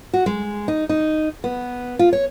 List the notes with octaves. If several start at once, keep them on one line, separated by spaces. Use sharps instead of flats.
F#4
G#3
D#4
D#4
B3
F4
C#5